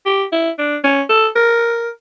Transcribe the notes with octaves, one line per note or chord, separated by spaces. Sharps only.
G4
E4
D4
C#4
A4
A#4